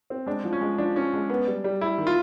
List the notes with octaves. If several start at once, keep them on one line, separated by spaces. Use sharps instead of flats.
C4
G#3 D4
F3
C#4
G#3
F3 D4
C#4
G#3
B3
G3
G3
G3 E4
D#3
F4